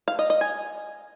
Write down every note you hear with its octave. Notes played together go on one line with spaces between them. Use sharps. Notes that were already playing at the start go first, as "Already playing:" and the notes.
F5
D#5
D#5
G#5